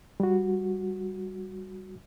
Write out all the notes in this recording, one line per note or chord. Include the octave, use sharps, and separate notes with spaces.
G3 F#4